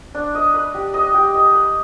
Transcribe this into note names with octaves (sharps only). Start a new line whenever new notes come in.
D4
D#5
B4
G4
D#5
G4
D#5
B4